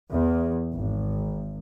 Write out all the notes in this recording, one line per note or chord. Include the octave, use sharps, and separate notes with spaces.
E2
G#1